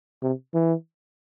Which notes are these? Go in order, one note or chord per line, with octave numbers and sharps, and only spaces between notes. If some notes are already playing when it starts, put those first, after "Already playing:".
C3
E3